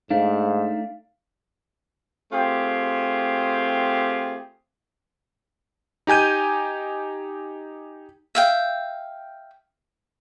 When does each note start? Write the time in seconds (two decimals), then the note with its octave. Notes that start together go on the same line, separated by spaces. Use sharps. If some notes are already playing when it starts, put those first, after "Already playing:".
0.10 G#2 A3 D4 D#4 F5
2.32 A3 C4 F4 G4 G#4
6.07 D#4 G4 G#5 G6 D#7
8.35 E5 F5 G5